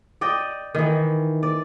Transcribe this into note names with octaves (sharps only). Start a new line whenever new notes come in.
D5 D#5 G5
D#3 E3
D5